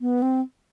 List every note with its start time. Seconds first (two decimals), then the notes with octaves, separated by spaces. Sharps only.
0.01 B3
0.22 C4